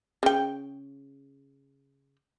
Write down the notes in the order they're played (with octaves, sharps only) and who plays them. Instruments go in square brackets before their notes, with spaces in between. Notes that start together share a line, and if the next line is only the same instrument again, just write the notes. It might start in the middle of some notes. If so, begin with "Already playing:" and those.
[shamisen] C#3 G5